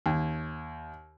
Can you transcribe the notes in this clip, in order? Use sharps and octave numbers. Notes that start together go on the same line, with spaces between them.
D#2